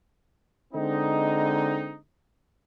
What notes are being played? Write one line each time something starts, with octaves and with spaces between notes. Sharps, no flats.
D3 G#3 C4 D#4